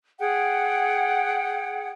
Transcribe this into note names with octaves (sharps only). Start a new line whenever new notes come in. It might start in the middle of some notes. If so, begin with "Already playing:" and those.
G#4 F#5 G5